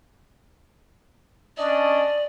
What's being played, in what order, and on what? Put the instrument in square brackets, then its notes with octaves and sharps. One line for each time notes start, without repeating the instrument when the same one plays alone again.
[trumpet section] C#4 D4 D#5 [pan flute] D5